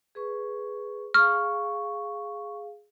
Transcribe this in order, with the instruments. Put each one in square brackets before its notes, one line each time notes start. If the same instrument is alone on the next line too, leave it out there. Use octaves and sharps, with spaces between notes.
[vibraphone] G#4 B4 C#6
[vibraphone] G#4 F5 [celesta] C#6 [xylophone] F6